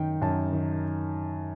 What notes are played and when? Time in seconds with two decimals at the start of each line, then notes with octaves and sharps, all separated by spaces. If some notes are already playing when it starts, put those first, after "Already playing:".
Already playing: F#2 D#3 G5
0.21 F#2 A5
0.52 D#3